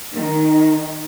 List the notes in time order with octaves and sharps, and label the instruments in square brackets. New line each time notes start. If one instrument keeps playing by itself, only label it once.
[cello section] D#3